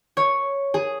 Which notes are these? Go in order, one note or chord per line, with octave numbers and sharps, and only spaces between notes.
C#5
G#4